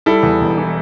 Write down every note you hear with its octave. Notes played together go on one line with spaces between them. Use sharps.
G3 E4 A4
E2
E1
E3